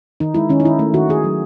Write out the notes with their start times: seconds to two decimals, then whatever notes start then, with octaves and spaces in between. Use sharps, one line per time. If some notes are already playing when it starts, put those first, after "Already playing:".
0.20 D#3 D#4
0.34 G#3 E4
0.49 D#3 C#4
0.60 D#4
0.64 D#3 E4
0.79 A3
0.94 D#3 F#4
1.09 D#3 G#4
1.24 F#3